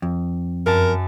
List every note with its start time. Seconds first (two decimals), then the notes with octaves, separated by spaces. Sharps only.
0.02 F2
0.66 F#2 A#4 A5